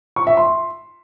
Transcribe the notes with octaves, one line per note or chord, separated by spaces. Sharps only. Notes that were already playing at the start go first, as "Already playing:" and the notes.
C#6
E5
C6